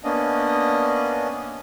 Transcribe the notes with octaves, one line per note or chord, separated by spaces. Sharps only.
A#3 B3 C#4 D4 D#5